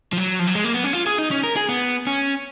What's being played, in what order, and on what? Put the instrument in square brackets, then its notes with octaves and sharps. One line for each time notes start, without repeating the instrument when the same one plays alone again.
[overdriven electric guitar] F3
F#3
F3
F#3
G#3
A#3
B3
C#4
F4
G#4
D#4
C#4
A#4
G#4
B3
C#4